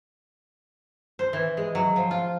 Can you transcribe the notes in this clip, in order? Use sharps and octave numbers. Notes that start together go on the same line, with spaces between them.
C5
E3
G#3
F#3
F3
F4